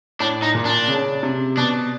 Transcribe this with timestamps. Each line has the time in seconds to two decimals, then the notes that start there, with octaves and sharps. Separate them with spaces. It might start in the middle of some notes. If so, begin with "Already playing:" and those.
0.20 A2 D4
0.42 D#4
0.55 A#2
0.65 D4
0.88 C#3
1.23 C3
1.57 B2 D4